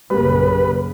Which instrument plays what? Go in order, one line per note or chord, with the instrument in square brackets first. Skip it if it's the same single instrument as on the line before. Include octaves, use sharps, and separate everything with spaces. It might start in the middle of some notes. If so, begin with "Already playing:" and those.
[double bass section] A#1 F#2 C#3 [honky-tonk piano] G3 A#3 [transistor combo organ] B4